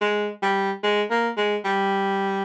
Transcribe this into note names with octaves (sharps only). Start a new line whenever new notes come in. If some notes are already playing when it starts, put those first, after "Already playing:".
G#3
G3
G#3
A#3
G#3
G3